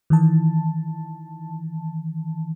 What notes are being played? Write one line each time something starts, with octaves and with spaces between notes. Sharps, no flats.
D#3 E3 A5